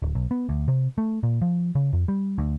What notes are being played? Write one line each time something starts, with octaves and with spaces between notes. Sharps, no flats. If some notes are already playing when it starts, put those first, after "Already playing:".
D1
B1
B3
D2
C3
A3
A#2
F3
C#3
F2
G3
D2